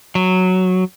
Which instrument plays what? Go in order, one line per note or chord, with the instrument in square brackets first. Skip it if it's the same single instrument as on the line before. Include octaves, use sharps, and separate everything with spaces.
[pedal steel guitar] F#3